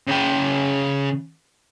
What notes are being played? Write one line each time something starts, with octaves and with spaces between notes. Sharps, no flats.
C#3 G5